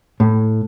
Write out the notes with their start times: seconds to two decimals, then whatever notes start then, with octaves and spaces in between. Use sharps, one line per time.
0.20 A2